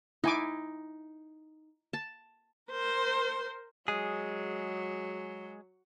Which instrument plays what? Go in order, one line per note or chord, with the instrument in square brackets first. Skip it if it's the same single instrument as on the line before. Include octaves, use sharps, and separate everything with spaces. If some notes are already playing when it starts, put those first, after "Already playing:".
[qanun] D#4 [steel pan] E4 G#5 D6
[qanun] A5
[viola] A#4 C5
[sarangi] F#3 [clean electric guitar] G#3 G#4